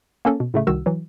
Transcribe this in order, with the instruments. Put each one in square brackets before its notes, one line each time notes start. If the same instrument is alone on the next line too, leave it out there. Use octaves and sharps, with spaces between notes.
[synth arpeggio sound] A#3 C#4 A4
B2
A2 C#3 A3
C2 D#3 F#4 E6
E3 F#3